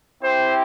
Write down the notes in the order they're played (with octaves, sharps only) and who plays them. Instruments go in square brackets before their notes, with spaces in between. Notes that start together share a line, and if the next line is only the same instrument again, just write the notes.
[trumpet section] C4 E4 G4 C5